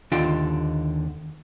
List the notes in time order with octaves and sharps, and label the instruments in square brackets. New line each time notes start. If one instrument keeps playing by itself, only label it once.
[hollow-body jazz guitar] D#2 D3 F4 G5